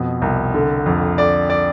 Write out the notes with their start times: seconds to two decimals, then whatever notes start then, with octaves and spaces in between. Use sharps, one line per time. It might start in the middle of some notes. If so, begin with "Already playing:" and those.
Already playing: F2 B2
0.22 C2
0.54 D3
0.86 F2
1.18 D3 D5
1.50 D5